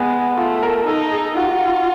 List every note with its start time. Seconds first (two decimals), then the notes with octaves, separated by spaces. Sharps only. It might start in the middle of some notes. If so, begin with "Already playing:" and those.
Already playing: G#3 B3
0.37 A3 F4
0.63 A#4
0.87 D#4 A4
1.12 G#4
1.36 F4 F#4
1.44 G4
1.51 F#4